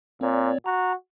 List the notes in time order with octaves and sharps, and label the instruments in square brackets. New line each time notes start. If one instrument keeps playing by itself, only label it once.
[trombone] A#2 [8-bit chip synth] C4 C#5 D5
[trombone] F#4 [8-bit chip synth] A#5